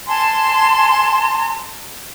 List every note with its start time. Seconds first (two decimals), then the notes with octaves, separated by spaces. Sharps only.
0.07 G#5 A5 C6